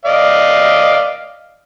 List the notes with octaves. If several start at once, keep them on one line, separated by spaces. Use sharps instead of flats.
D5 D#5 F5